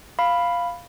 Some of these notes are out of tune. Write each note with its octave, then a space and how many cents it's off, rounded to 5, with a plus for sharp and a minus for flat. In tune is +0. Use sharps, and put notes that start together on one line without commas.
F5 +0 B5 +0